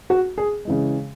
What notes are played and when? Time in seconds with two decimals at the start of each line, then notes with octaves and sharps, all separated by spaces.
0.10 F#4
0.38 G#4
0.65 C#3 E3 G#3